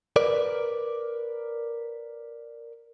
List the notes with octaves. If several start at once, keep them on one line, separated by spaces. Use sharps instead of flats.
A#4 B4 D5